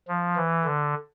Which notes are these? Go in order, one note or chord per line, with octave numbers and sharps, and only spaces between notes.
F3
E3
D3